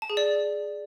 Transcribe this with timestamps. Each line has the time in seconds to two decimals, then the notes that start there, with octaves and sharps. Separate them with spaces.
0.02 A5
0.10 G#4
0.17 D5